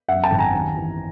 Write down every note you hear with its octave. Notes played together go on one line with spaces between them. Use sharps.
F#2 E5 F#5
G5 A5
G#1
G#5 A#5
D#2
E3